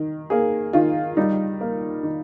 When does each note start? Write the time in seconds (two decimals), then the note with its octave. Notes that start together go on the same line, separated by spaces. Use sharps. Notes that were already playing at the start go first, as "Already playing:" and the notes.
Already playing: D#3
0.30 A#3 G#4
0.73 D#3 F4
1.17 G3 D#4
1.61 A#3
2.03 D#3